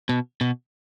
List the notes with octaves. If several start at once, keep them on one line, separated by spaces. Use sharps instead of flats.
B2
B2